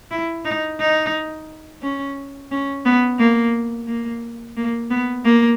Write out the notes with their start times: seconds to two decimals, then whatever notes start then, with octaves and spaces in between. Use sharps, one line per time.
0.11 E4
0.45 D#4
0.79 D#4
1.82 C#4
2.51 C#4
2.85 B3
3.19 A#3
3.87 A#3
4.56 A#3
4.90 B3
5.24 A#3